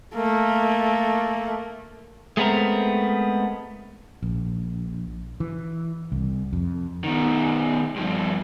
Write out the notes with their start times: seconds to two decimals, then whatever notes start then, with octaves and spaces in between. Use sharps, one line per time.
0.15 A3 A#3
2.37 G#3 A3 B3 C4 A#4
4.23 A#1
5.40 E3
6.12 C2
6.53 F2
7.04 B2 D#3
7.96 G2 F3